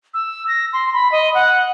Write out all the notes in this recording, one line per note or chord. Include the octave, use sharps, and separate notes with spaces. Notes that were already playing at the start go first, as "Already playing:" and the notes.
E6
A#6
C6
B5
D#5
F#5